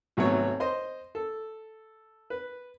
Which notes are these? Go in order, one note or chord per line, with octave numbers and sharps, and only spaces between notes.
G#1 C3 F#3 A3 B3 C#5
C5 D#5 C6
A4
B4